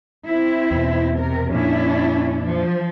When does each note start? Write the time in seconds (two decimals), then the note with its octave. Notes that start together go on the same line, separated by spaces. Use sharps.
0.26 C4 E4
0.71 E2 B2
1.17 C3 A#4
1.50 F2 A#2 C#4 D4 E4
2.43 F3